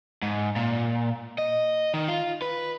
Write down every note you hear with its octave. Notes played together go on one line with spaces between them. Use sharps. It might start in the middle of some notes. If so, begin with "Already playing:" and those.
G#2
A#2
D#5
D#3
F4
B4